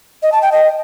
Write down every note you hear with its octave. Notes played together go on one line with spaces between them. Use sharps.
D#5
A5
G5
D#5